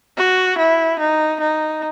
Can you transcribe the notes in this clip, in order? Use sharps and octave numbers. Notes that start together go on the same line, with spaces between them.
F#4
E4
D#4
D#4